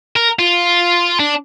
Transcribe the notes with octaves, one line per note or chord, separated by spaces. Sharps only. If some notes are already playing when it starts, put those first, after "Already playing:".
A#4
F4
D4